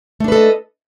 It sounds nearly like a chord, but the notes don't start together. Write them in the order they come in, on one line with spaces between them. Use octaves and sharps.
A3 D4 B4 A4 D#5